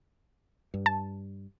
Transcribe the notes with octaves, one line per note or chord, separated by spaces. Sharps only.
G2
A5